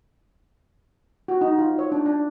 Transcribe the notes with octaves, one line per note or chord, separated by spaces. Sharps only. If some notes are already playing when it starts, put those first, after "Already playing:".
F#4
D#4
F4
C#5
D4
D4